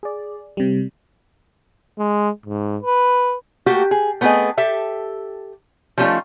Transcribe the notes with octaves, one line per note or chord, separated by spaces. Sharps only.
G#4 D5
C3 G3
G#3
G#2
B4
A3 A#3 F#4 G4
G#4
A3 B3 C4 G4 G#4 D#5
G4 A4 E5
F3 G3 A3 C#4 D#4 F4